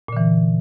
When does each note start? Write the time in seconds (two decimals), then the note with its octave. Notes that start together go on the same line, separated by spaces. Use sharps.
0.08 A#2
0.12 D3
0.17 E3